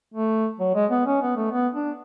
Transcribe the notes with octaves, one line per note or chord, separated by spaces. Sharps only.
A3
F#3
G#3
B3
C#4
B3
A3
B3
D4